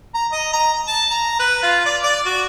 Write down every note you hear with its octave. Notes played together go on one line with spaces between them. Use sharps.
A#5
D#5
A#5
A5
A#5
B4
F4
D5
D5
F#4